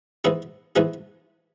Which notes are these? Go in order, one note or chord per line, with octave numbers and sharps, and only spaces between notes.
G#2 E3 B3 E4 G#4
G#2 E3 B3 E4 G#4